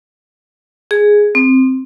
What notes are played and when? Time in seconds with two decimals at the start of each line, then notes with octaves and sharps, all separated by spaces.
0.91 G#4
1.35 C4